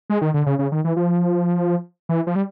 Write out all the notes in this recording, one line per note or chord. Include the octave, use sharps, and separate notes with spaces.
G#3
D#3
D3
C#3
C#3
D#3
E3
F3
E3
F3
G3